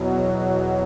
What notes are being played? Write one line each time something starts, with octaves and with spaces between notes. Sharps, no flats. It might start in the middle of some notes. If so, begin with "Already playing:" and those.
Already playing: E2 B2 F#3